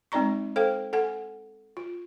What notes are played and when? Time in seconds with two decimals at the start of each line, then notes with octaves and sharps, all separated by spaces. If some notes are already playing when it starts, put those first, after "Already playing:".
0.12 G#3 C4 D#4 D5 A#5 C#6
0.56 A4 C5 F5 G5
0.93 A4 F#5 G#5
1.77 F4